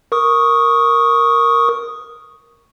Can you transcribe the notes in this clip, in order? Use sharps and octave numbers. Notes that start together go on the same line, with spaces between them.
A#4 C#6 D#6